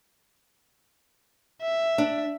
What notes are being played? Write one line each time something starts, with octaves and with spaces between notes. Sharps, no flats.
E5
D4